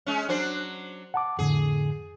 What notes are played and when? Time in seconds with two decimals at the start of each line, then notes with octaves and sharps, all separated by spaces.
0.06 G#3 C#4
0.29 F#3 D4 C5
1.14 F#5 A5 D6
1.39 F2 A2 D3 G#4